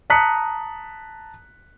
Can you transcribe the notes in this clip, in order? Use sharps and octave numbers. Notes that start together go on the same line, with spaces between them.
A5 A#5 D#6 F#6 B6 C#7